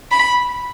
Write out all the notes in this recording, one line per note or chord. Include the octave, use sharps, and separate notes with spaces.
B5